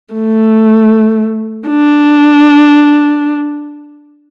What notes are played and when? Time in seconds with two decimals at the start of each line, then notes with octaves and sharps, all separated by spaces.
0.14 A3
1.69 D4